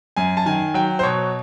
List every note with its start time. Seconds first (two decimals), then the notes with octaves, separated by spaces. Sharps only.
0.17 F#2 G#5
0.37 A5
0.46 D#3 G#5
0.74 F#3 G5
0.99 C5
1.03 B2 C#5